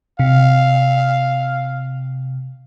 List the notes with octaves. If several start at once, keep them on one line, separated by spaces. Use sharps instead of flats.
C3 F5